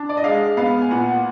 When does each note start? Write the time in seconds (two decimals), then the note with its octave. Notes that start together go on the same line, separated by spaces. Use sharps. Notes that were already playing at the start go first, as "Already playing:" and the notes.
Already playing: D4
0.09 D5
0.17 D#5
0.24 G#3 F5
0.57 B3 F5
0.81 G#5
0.91 A#2 F#5